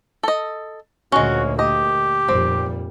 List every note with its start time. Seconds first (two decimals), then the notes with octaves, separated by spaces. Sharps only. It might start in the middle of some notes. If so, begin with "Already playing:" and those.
0.23 A4 D#5
1.12 D2 A#2 G#3 A#3 C#4 F#4
1.59 G4 D#5
2.28 F1 A#2 G3 C4